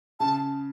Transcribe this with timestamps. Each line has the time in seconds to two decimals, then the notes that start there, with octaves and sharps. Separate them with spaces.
0.20 C#3 A5